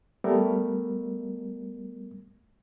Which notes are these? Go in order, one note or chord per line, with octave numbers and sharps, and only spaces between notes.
G3 A3 B3 A#4